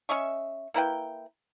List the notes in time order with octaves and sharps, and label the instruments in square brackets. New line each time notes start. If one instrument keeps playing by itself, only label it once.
[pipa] C#4 D#5 E5 C#6
A#3 E4 B4 G5